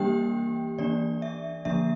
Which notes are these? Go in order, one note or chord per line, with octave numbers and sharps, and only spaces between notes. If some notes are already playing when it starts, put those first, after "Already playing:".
Already playing: E3 G3 A#3 D4 G4 G5
E3 A#3 D4 D5
E5
D3 F3 A#3 D4 E5